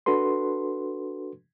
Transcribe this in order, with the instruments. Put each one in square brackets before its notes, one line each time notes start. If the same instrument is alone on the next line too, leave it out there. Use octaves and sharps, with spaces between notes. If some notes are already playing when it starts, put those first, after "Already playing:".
[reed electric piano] D4 F#4 A4 B4 C6